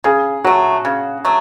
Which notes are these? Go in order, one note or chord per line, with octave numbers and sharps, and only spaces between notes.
C#3 G#4
F#3 A3 F#4
C#3
F#3 A3